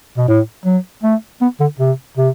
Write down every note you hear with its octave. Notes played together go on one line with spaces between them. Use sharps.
B2
A2
F#3
A3
B3
D3
C3
C3